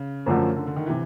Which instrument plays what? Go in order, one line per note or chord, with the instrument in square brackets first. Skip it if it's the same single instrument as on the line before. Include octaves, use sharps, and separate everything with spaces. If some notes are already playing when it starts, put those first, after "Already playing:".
Already playing: [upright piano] C#3
[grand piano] F#2 D3 F3 A3 C#4
[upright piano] D3
D3
D#3
[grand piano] C3 [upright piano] E3